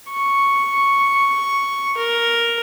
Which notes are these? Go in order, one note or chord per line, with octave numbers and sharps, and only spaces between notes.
C#6
A#4